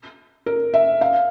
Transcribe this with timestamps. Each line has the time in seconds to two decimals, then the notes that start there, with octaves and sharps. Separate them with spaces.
0.46 A#4
0.74 E5
1.01 F5